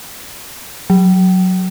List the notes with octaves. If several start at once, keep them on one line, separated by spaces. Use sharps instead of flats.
F#3